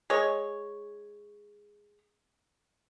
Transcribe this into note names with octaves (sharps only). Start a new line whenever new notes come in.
G#3 C#5